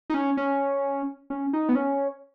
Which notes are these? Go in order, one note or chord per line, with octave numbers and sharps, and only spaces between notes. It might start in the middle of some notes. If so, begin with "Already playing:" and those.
D#4
C#4
C#4
C#4
D#4
B3
C#4